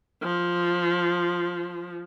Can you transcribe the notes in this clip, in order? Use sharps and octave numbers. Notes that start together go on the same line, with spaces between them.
F3